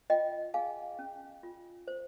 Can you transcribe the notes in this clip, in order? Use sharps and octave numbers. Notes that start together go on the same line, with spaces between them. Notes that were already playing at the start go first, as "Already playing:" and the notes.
F4 D#5 G5
G#4 F5 G#5
C#4
F4
C5